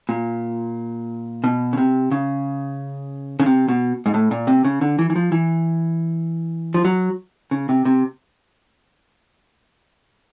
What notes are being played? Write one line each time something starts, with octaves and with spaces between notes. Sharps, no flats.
A#2
B2
C#3
C3
C#3
C#3
C3
B2
G#2
A2
A#2
C3
C#3
D3
E3
E3
F3
E3
F3
F#3
C#3
C3
C3